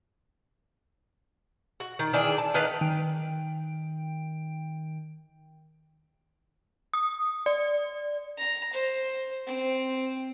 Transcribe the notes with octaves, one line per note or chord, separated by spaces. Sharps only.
F#4
D#3
D#3 E3 D4 G#4
A5
D#3 B4 D5 F5
D#3 G5 D7
D#6
D5
A#5
C5
C4